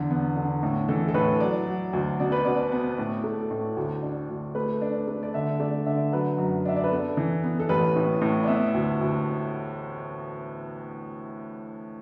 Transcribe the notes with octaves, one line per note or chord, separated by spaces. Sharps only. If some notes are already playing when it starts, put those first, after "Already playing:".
Already playing: E2 D3 A4
B3
D3
A2
E3 A4
A4
A2 B4
F#3 D5
F#3
D2
B2 D5
B4
B2 D5
B3
A2
A3
A2
D2
D4
D2
A3 B4
D4
A3
D5
D3 E5
A3 D5
D3 E5
F#3 B4
F#2
D4 E5
D5
B4
B3 A4
E3
B3
A4
A1 B4
A2
A2
D5
B3 E5
D2
D2